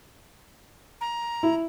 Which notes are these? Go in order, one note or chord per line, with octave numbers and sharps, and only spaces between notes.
A#5
E4